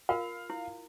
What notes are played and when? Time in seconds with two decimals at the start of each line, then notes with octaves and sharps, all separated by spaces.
0.09 F4 A#4 F5
0.50 E4